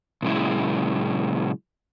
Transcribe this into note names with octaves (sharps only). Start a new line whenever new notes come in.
A#2 C#3 F#3 G#3 E4